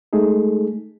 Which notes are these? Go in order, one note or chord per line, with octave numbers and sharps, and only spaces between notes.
G#3 A3 D#4 G#4 A4